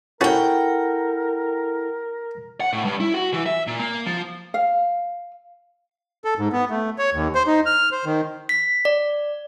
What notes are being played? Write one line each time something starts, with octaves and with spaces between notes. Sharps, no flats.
C#4 E4 F#4 A4 A#4 D5 F#5 G5
F#5
A2
G2
E4
F#4
E3
E5
A#2
A#3
F3
F5
A4
G#2
B3
A3
C#5
D#2
C5
D#4
F6
C5
D#3
B6
D5